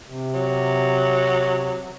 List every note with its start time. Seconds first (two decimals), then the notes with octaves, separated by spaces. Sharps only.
0.08 C3
0.34 F#3